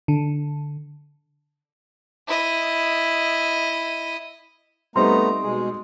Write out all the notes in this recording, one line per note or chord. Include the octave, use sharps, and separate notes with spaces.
D3
E4 D#5
G3 A3 B3 C4 D#4 A#5 C6
B2 G#3 G#4